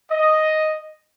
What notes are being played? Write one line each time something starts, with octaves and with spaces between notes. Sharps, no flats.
D#5